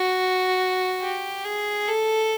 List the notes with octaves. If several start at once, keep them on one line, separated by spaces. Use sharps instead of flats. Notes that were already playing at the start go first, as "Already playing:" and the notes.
Already playing: F#4
G4
G#4
A4